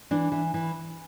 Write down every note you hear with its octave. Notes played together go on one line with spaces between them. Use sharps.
E3 D4
E3
E3